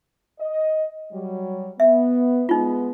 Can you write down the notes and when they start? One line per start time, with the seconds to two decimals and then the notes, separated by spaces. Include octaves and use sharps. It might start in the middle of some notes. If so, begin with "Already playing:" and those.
0.40 D#5
1.12 F#3 G3
1.80 B3 E5
2.49 G#3 B3 D#4 F4